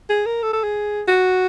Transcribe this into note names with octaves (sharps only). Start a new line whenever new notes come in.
G#4
A#4
A4
A4
G#4
F#4